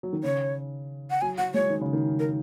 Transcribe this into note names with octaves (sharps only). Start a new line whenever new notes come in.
F#3
D#3
C#3 C#5
F#5
F#3 G#5
F#3 F#5
G#3 C#5
D#3
C#3
D#3
A#4